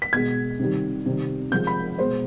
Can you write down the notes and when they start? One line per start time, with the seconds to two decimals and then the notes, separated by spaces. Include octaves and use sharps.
0.02 B6
0.13 B2 G#3 G#6
0.60 C3 D#3 G3
1.06 C3 D#3 G3
1.52 C3 F3 G#3 G6
1.67 B5
1.98 B2 G#3 C5